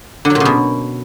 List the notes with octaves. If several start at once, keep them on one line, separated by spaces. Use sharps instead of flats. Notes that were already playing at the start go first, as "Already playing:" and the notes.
D3
F#3
A#2
C#3
B2